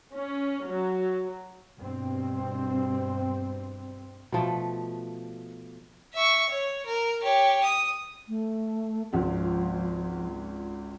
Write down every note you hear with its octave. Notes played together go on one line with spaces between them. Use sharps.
C#4
F#3
G2 B2 C4
B2 F3 A3
E5 C#6
C#5
A#4
G4 C#5
D#6
A3
G#1 C#2 F3 F4